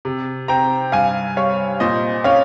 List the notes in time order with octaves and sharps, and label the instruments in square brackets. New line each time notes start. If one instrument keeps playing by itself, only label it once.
[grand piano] C3
C4 G5 A#5
G2 F5 G#5
G3 C#5 F5
A#2 C5 D#5
C#4 C#5 F5